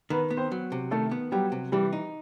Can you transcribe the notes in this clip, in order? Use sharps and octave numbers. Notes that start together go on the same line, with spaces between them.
D#3 B3 B4
B3
C4 C5
F#3
C3
D#3 A3 A4
B3
F#3 G3 G4
C3
E3 G3 G4
D#4